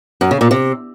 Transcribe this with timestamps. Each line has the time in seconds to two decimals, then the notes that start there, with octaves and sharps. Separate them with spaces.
0.21 F#2
0.31 C#3
0.41 A#2
0.51 C3